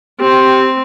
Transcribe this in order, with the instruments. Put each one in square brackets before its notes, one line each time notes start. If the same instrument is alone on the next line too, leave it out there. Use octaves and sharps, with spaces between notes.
[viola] C4 [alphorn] G4